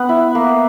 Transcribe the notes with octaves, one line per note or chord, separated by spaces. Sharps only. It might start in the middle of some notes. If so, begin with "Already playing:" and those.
Already playing: B3 F#5
E4
A#3